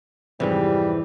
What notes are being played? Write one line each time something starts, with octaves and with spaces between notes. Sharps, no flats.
F2 G#2 C3 E3 G3